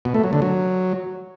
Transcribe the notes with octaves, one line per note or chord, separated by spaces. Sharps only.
B2
A3
F#3
D3
F#3